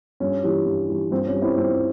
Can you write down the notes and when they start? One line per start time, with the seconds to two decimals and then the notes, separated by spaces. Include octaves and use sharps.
0.20 G2 C#4
0.43 E3 G3
0.66 G2
0.89 E3 G3
1.11 G2 C4
1.26 C#4
1.34 G3
1.42 C4 E4
1.57 G2 C4